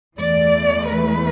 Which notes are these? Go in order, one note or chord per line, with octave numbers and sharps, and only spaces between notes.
E2 E3 A3 D5
B4